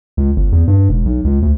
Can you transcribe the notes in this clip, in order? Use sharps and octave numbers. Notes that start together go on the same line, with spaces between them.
C#2
G1
E2
G2
E1
B1
C#2
D2